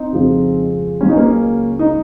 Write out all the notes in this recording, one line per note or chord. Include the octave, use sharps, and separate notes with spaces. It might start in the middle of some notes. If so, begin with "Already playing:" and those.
Already playing: C4 D#4
F2 C#3 F3 G#3
C#2 C#3 F#3 C#4
D#4
A#3 C#4
D#4